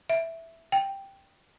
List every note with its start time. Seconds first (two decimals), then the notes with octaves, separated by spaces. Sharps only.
0.10 E5
0.72 G5